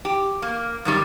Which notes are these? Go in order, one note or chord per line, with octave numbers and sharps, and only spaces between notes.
G4
A#3
F#2 D#3 G3